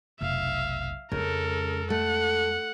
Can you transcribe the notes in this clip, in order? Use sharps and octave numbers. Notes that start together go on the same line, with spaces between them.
F1 B1 E5 F5
F2 C#3 G#3 A4 A#4
A3 F#5